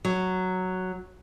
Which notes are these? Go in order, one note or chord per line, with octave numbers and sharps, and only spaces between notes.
F#3